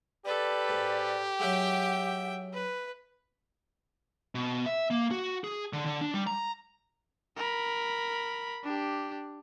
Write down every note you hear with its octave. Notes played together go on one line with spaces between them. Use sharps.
G4 A4 B4 D5
G#2
F#3 G#3 E5 F#5 G5
B4
B2
E5
A#3
F#4
G#4
D3
D3
D4
G3
A#5
A#4 B5
D4 G4